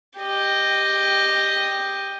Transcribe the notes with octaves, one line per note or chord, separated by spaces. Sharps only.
G4 D#5